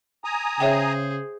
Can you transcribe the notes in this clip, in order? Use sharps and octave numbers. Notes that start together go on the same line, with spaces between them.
G#5 A#5 D#6
C#3 G#4 C5 C#5 E5 G5